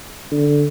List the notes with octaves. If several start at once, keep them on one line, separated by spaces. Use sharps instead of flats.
D3